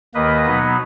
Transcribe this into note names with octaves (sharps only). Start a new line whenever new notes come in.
D#2 D#3 A#3 B4 D#5
B2 F#3 B3 D#4